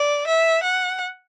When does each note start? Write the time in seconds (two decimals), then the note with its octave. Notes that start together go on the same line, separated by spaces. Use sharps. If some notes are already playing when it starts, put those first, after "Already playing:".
Already playing: D5
0.27 E5
0.63 F#5